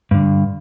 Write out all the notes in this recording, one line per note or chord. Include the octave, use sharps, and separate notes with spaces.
G2 D3